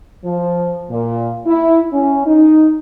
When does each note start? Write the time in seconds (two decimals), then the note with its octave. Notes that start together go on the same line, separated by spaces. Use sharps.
0.24 F3
0.90 A#2
1.46 E4
1.93 C#4
2.26 D#4